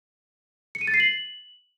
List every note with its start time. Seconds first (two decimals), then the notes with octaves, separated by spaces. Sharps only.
0.75 C#7
0.81 D#7
0.87 A6
0.94 C7
1.00 F#7